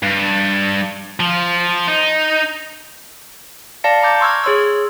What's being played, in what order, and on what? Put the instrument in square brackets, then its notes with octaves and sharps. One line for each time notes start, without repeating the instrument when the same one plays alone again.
[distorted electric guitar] G2
F3
D#4
[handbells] D5 F5 A5 A#6 C#7
A#5 D6 G6
C6 C#6 E6 F6 G#6
G#4 C#5 C6 E6